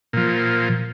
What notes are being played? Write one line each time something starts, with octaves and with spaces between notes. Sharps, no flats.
A#2 F3